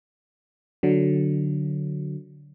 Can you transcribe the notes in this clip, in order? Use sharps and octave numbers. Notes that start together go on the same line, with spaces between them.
D3 F#3